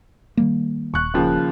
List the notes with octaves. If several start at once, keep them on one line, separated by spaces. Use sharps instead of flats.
D#3 G3 A#3
D#1 C#6 F#6
D#2 C#3 F3